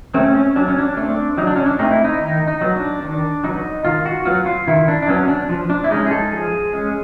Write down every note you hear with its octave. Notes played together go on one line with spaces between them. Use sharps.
A3 C4 C#4
C#4
F#3 D4
C#4
D4
A3 C4 D4
F#3 D#4
D4
C#4
D4
A3 C4 D#4
E4
D#4
D#3 D#4
D#4
F#3 B3
D4
D#3 D4
F#3 B3 D#4
D#3 F4
F#4
F#3 B3 F4
F4
D#3 E4
D4
D4
F#3 B3 C#4
D4
F3
D4
E4
G#3 C#4 D#4
G#4
A4
F3 G#4
G#3 C#4